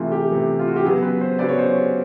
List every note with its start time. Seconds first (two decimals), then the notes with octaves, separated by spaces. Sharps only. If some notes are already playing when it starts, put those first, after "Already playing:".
Already playing: C3 E3 A3 F4
0.12 G4
0.30 C3 E3 A3
0.59 F4
0.67 F#4
0.76 G4
0.84 C#3 F#3 B3 G#4
1.02 B4
1.21 C5
1.39 C#3 F#3 B3 D5
1.49 C#5
1.58 C5
1.69 C#5